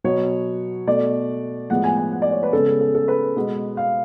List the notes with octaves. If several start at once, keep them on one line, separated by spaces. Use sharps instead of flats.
B2 F#3 B3 C#5
B2 A3 D5
A2 F3 G#3 B3 F#5
G#5
G#5
F#5
D5
C#5
B4
C#3 G#3 B3 A4
G#4
A4
A4
B4
B2 G#3 B3
F5